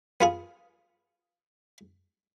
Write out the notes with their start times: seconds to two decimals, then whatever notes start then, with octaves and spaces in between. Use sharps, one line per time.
0.21 B3 F4 G#4